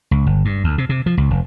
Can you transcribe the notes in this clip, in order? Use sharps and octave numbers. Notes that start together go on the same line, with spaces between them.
C#2
G1
G2
D2
C3
C3
F3
C#2
F1